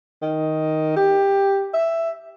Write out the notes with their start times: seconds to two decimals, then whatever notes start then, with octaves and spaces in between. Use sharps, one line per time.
0.22 D#3
0.96 G4
1.74 E5